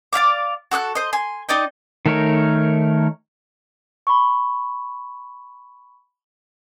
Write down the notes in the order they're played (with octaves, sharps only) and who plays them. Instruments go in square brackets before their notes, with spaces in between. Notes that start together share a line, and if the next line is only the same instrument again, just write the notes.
[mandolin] D5 E5 F5 D6
F#4 A4 D#6 F#6
C5 D#5
G#5 C6
D#4 D5 D#5 G5
[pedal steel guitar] D#3 A3 D#4 A#4 C#5
[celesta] B5 C#6